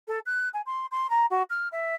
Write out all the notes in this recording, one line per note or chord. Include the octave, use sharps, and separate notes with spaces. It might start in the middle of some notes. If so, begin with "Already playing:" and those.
A4
F#6
G#5
C6
C6
A#5
F#4
F6
E5